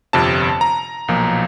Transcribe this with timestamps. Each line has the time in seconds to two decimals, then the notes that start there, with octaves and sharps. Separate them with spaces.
0.13 G1 F2 C3 A5
0.61 A#5
1.08 B1 A#2 F3